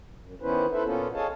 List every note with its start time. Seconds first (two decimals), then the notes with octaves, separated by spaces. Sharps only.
0.23 F#2
0.42 D#3 B3 C#4 E4 B4 C5
0.72 E4 A4 B4 C5 E5
0.84 A#2 A#3 B3 C#4 F4 A4
1.14 G#4 A4 C#5 D#5 F5 A5